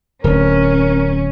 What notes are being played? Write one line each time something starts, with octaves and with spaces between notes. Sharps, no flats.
D1 C#4 A#4